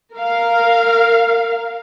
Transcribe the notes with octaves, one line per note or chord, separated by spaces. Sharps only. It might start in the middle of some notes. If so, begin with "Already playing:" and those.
A#4 F5